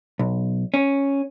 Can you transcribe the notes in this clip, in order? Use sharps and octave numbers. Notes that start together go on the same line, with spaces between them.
B1
C#4